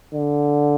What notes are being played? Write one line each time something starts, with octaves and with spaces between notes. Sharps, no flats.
D3